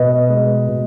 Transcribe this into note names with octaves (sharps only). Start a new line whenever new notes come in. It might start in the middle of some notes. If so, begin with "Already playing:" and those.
Already playing: B2 B4 D#5
G#3
B2